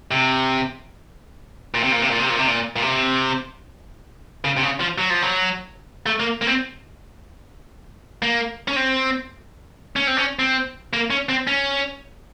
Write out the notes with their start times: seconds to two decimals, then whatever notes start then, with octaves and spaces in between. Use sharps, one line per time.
0.11 C3
1.74 A#2
1.83 C3
1.92 A#2
2.02 C3
2.10 A#2
2.19 C3
2.30 A#2
2.39 C3
2.47 A#2
2.76 A#2
2.82 C3
4.44 C#3
4.57 C3
4.63 C#3
4.80 F3
4.98 F#3
5.10 F3
5.22 F#3
6.06 A3
6.20 A#3
6.41 A#3
6.47 C4
8.22 A#3
8.68 C#4
8.76 C4
9.96 C#4
10.07 C4
10.17 C#4
10.39 C4
10.93 A#3
11.10 C#4
11.29 C4
11.47 C#4